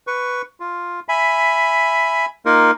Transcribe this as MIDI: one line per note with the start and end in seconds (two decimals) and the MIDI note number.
0.07 0.42 71
0.07 0.42 85
0.60 1.00 65
1.09 2.26 76
1.09 2.26 80
1.09 2.26 83
2.46 2.71 58
2.46 2.71 63
2.46 2.71 65
2.46 2.71 70